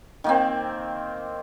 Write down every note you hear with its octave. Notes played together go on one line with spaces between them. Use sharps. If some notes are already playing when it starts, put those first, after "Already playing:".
D#3 A#3 C4